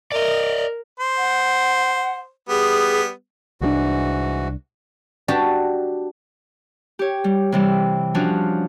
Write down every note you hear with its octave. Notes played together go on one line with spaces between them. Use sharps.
A#4 D5 D#5
C5
F#5
G3 B3 G#4
C2 G#2 E3 F3 D4 F#4
D4 F#4 G4 A5
G4 C#5
G3
C3 E3 G3
F3 C#4 D4 F4 F#4